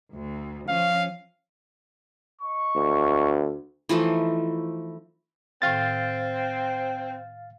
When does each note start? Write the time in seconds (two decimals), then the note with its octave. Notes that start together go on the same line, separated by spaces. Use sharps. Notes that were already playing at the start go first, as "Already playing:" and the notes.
0.13 D2
0.69 F3 C#4 F5
2.41 D#5 C#6
2.75 D2
3.89 E3 F3 A3 D#4
5.62 A2 D#3 C4 F5 A6